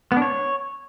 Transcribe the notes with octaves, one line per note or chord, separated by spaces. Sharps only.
B3
D4
C#5